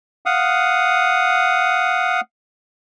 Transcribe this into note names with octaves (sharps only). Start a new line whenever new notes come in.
F5 F#5 D#6